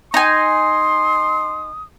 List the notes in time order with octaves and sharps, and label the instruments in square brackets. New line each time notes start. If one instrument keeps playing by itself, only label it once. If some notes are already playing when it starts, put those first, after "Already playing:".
[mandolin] D#4 G#5 [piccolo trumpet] C6 [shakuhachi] D#6